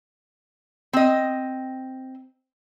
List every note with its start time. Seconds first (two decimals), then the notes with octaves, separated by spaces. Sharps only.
0.93 C4 D#5